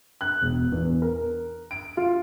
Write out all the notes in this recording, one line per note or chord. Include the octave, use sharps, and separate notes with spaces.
F#6
E1
E2
A#4
D7
F4